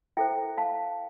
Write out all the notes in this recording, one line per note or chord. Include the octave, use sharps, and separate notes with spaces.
E4 A4 C5 E5 G5
F5 A5